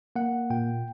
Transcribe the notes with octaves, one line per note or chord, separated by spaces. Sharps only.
A#3 F#5
A#2 G5